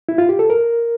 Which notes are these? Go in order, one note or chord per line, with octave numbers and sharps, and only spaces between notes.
E4
F4
G4
A4
A#4